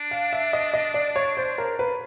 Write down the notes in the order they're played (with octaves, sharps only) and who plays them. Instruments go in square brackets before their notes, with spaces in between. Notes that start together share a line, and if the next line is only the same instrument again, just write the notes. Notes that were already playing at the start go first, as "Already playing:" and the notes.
Already playing: [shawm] D4
[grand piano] F5
E5
D#5
D#5
D5
C#5
C5
A#4
B4